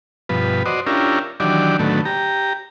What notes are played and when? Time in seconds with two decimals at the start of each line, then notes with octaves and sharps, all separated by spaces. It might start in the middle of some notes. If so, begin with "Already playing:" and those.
0.29 G2 B2 F3 B4
0.66 F#4 C5 D5 D#5
0.86 C#4 D4 E4 F4 G4 A#4
1.40 D#3 E3 F#3 D4 G4 D5
1.79 A2 D3 D#3 F#3 A3 B3
2.05 G4 A#5